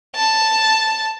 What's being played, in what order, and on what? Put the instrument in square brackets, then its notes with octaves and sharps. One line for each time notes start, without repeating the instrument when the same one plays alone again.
[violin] A5